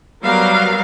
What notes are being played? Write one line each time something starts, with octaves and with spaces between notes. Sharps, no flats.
F#3 G3 B3 A#4 F5